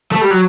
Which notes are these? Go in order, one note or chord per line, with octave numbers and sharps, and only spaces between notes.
A3
G3
F#3